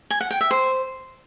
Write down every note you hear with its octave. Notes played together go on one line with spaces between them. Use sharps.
G#5
F#5
G5
E5
C5